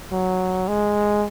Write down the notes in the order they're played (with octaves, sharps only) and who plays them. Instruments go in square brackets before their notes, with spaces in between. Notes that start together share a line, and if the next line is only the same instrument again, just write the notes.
[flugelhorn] F#3
G#3